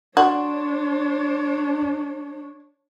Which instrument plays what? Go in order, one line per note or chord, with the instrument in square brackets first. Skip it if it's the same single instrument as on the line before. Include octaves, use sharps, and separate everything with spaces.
[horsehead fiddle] D4 C#5 [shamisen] F#4 [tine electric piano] D5 C6